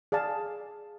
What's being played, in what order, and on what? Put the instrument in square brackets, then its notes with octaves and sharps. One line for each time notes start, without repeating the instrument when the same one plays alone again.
[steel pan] G#4 D5 F5 A5